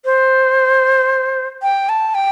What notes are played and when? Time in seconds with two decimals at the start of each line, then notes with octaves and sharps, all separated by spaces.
0.05 C5
1.62 G5
1.89 A5
2.15 G5